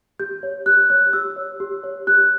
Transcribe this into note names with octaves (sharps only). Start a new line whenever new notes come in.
G4 G6
C#5
G4 F#6
C#5 F#6
G4 E6
C#5
G4
C#5
G4 F#6